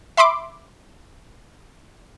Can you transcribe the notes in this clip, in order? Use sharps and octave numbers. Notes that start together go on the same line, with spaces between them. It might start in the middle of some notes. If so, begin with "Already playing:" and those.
E5 B5 C6 D6